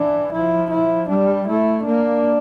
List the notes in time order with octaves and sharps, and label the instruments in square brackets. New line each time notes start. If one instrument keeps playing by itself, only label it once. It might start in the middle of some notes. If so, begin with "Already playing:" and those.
Already playing: [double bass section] E3 [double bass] D4
[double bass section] F3 [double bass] E4
[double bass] E4
[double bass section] G3 [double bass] D4
[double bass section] A3 [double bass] E4
[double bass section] A#3 [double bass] D4